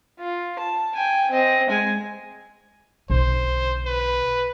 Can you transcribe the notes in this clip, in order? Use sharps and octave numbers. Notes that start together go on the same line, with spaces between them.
F4
A5
G5 G#5
C4 D#5
G#3 G#5
B1 D3 C5
B4